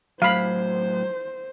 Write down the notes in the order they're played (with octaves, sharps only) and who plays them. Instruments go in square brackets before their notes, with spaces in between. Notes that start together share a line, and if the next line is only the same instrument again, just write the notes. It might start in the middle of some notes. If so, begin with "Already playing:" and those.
[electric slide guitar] A2 F#3 [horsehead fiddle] C5 [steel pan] F5 B5